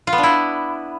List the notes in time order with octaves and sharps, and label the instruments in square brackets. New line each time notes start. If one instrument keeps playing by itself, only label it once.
[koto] F4
B3
D4
E4